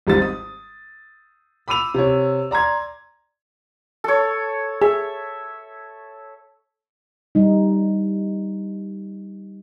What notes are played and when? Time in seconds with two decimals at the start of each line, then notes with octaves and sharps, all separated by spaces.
0.07 G#1 G#2 G3 C4 A6
0.22 D#6
1.68 B5 D6 E6 D#7 F7
1.94 C3 C#5
2.51 D5 A#5 C6 G#6
4.04 A4 C#5
4.82 G#4 E5
7.35 G3 D#4